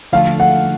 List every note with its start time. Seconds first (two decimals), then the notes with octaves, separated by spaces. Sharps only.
0.12 D3 F3 A3 F4 A4 F5
0.40 F#5